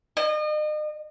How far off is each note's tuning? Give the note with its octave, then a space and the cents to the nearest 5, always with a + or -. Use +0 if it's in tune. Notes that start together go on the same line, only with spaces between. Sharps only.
D#5 -40